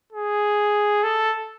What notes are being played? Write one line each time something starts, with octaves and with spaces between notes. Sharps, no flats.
G#4
A4